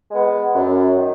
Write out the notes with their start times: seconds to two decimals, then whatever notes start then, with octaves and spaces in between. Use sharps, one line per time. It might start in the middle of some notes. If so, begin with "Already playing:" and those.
0.11 G#3 B3
0.55 F#2
0.98 D#3